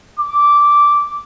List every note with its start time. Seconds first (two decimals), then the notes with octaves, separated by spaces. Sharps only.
0.19 D6